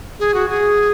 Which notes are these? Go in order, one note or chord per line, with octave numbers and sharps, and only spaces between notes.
G#4
F#4
G#4